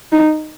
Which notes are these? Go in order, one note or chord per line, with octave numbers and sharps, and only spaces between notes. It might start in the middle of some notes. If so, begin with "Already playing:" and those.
D#4